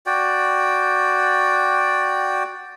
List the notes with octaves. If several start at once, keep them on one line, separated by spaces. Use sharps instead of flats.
F#4 D5 G5